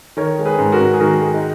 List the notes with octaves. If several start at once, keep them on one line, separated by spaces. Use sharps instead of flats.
D#3 A#4 C#5
G#3
G#4 B4
G#2
F#4 A#4
G#2
G#4
D#3 F#4 A#4
G#3
D#4